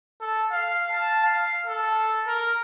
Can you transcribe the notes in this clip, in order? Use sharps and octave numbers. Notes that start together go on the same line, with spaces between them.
A4
F5
A5
F5
A4
A#4